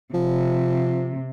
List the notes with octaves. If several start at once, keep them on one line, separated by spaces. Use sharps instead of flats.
C3 F3